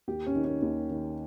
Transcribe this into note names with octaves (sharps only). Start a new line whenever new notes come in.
D#2 G4
C#4
D#3
C#4
D#2
D#3